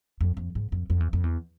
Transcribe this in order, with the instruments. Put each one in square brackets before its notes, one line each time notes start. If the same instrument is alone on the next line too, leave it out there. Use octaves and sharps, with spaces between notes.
[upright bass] F2
F2
G#2
F2
F2
E2
F2
E2